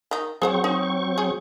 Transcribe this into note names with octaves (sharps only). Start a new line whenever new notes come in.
D#3 D#4
F#3 C4 G#4 C5 F#5 C#6
D#4
G#4